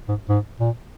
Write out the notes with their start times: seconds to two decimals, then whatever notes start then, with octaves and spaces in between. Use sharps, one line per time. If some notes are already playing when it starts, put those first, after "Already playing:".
0.08 G#2
0.29 G#2
0.60 A#2